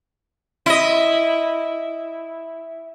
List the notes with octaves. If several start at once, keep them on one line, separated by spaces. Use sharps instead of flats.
E4 D#5